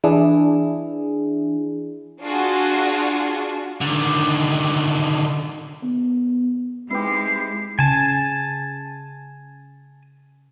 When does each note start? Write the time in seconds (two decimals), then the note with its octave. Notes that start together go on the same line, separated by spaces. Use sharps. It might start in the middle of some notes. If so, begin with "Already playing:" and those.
0.04 E3 D4 E4 G#4
2.21 D4 F4 F#4 G#4
3.81 D3 D#3
5.83 B3
6.90 G#3 C4 D#4 E4 G4 B4 C7
7.79 C#3 G#5 A5